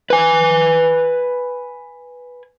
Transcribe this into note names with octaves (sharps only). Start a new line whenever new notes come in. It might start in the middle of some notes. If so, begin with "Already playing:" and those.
B4 G#5